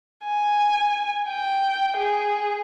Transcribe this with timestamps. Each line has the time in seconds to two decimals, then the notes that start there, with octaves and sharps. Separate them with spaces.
0.24 G#5
1.29 G5
1.97 G#4